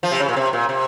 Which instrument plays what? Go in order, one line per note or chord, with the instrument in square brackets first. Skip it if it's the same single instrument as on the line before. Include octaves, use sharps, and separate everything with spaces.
[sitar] F3
C3
C#3
A#2
C3
A#2
C3